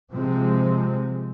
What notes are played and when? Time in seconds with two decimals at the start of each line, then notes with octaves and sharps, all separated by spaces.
0.14 C3 F3 G#3 C4